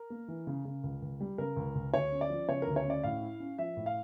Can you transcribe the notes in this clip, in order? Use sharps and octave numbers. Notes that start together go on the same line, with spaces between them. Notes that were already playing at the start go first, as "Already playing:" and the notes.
Already playing: A#4
A#3
E3
C#3
C#3
C#2
C#2
G3
C#3 A#4
C#2
C#2
D2 C#5
C#4
D5
F3
C#3 C#5
D2 A#4
C#5
C#4 D5
A2 F5
E4
C#4
F3 E5
A2
F5